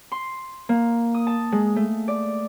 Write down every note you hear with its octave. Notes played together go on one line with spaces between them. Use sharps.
C6
A#3
D#6
A5
G#3
A3
D5